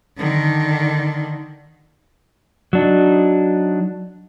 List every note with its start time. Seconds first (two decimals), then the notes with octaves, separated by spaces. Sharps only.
0.18 D3 D#3
2.73 F#3 D4 D#4